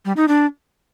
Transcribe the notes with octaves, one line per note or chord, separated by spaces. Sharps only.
G3
D#4
D4